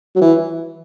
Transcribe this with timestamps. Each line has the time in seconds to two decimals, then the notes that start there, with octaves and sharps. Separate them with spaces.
0.15 F#3
0.21 E3